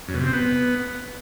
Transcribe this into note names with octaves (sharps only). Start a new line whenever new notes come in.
F#2
B2
C3
C4
B3